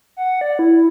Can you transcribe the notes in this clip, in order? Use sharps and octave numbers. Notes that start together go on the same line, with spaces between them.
F#5
D5
E4